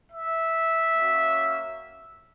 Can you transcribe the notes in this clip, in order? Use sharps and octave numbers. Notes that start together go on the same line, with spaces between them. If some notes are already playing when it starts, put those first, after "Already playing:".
E5
A#3 C#4 F#4